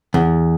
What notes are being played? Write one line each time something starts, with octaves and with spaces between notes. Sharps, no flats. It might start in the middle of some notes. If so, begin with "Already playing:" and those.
E2